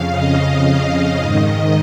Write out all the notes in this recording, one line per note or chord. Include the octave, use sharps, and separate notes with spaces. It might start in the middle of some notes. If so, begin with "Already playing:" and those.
Already playing: F2 C#3 F5
D#5
D#5
G#2 D#3